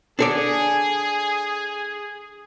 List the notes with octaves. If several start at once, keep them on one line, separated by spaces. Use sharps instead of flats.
D4 G#4 A4 D5